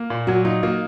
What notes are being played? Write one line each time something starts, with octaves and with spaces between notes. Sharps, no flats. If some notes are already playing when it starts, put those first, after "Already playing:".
Already playing: A#3 F4
A#2
F#3 F#4
D#4 F4
A#3 F4